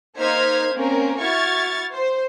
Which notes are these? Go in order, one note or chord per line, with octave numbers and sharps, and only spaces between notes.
A#3 D#4 C5 F6 G#6 B6
A#3 C4 C#4 A#4
E4 F#4 C#6 F6 G#6 A6
C5